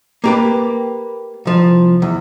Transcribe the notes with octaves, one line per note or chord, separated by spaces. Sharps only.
A#3 G4 B4
C2 F3
E2